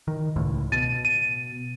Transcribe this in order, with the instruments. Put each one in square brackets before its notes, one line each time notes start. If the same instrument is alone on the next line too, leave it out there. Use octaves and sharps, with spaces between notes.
[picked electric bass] D#3
C#2 A2
[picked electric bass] B2 [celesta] A6 D#7
[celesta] D#7